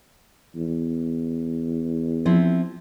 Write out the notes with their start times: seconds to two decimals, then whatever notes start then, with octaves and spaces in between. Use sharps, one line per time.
0.56 E2
2.26 F3 C4 E4